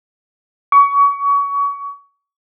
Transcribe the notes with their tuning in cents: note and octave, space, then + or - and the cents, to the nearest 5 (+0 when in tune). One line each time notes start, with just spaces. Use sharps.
C#6 +30